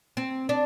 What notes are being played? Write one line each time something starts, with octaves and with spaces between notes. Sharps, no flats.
C4
D4